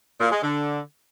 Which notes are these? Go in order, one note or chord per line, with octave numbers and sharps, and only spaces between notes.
A#2
G#3
D3